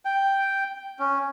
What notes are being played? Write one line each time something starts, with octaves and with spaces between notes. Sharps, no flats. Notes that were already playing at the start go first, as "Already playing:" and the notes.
G5
C#4